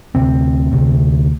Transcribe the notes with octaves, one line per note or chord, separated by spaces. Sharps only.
D2 C3 C4
D2 C3